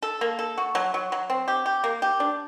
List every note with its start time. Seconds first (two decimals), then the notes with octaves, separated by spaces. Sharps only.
0.03 A4
0.21 A#3
0.39 A4
0.58 F#4
0.75 F#3
0.94 F#3
1.12 F#3
1.30 C4
1.48 G4
1.66 G4
1.84 A#3
2.02 G4
2.20 D4